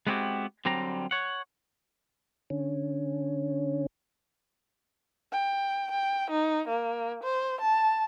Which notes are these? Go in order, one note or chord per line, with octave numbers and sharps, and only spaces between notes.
G#3 B3 C4 E4 F#4 G4
D3 F#3 G3 C4 A#5
C#5 F#5
D3 C#4
G5
G5
D#4
A#3
C5
A5